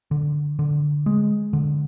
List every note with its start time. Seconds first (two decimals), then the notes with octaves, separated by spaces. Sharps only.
0.11 D3
0.59 D3
1.06 G#3
1.53 D3